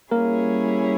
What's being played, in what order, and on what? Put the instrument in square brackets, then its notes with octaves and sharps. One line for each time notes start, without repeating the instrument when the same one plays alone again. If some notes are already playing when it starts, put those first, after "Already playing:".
[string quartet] G3 C#4 E4 G#4 C#5 [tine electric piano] A#3 A#4